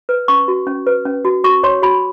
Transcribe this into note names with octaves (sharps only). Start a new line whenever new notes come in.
B4
C#4 C#6
F#4
C#4
B4
C#4
F#4
F#4 C#6
C#5 C6
F#4 B5